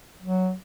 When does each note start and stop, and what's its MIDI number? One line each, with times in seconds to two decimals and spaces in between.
0.22 0.53 54